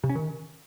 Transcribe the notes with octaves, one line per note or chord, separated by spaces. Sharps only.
C3
C#4
D#3